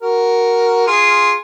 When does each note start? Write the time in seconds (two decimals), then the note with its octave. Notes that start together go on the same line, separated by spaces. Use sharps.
0.02 F#4 A#4
0.87 F4 G#4